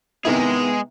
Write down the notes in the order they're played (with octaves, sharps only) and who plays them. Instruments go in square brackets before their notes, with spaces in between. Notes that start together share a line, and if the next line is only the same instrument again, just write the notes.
[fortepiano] C3 D#3 E4 [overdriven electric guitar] G#3 G#4 [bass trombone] B3